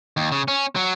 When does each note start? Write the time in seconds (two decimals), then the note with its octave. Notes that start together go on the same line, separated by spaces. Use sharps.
0.17 D#2
0.32 C#3
0.48 C#4
0.76 F#3